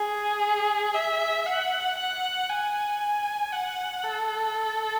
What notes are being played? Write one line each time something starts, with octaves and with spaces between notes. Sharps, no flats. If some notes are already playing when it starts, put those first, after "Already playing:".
Already playing: G#4
E5
F#5
F#5
G#5
G#5
F#5
A4